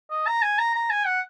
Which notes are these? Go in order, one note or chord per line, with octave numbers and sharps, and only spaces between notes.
D#5
A#5
G#5
A#5
A#5
G#5
F#5